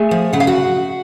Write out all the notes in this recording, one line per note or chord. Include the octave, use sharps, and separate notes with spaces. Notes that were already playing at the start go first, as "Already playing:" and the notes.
Already playing: A3 G#4 G#5
F3
C#3 F#5
F5
F#4 F#5